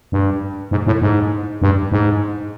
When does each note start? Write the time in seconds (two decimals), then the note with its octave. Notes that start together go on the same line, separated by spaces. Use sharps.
0.12 G2
0.71 G#2
0.87 A2
1.02 G#2
1.62 G2
1.92 G#2